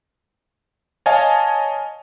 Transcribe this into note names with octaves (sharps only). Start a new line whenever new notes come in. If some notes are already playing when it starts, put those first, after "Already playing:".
C#5 D#5 F5 G#5 A5